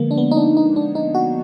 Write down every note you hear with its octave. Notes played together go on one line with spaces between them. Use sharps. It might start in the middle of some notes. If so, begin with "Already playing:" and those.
Already playing: D3 F3 G#3 A#3 B3
D4
B3
D#4
D4
D#4
D4
D#4
F#4